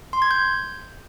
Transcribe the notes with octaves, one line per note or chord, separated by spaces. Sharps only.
C6
G#6
G6